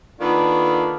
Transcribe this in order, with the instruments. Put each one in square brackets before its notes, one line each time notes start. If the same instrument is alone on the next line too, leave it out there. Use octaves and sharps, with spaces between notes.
[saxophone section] D#3 A#3 B3 D4 F4 A4